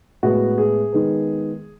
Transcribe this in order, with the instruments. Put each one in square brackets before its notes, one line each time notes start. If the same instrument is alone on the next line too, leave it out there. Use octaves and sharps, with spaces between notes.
[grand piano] A2 G#3 B3 F#4
G#4
D#3 G#3 B3